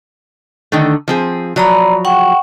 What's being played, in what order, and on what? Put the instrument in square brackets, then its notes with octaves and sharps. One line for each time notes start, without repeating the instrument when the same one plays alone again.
[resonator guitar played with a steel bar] D3 D#3 A3
F3 C4 G#4
[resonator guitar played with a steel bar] F3 F#3 [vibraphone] D5 A#5 B5
[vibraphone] F#5 G5 C#6